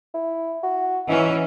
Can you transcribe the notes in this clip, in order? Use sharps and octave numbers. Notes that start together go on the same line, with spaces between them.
E4
F#4
E3 C#4 D#4